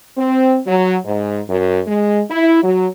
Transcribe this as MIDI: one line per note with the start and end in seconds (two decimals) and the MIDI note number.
0.17 0.58 60
0.67 0.96 54
1.05 1.39 44
1.49 1.79 42
1.87 2.20 56
2.30 2.60 64
2.63 2.87 54